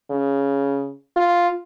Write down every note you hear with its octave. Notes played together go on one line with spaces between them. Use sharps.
C#3
F4